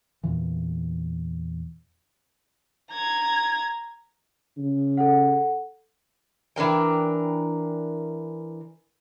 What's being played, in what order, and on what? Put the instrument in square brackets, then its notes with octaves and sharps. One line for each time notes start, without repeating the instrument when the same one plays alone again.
[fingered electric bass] E2 A#2 E3
[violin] A#5 G#6
[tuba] C#3
[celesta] A4 F#5
[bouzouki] E3 D4 A#4 G5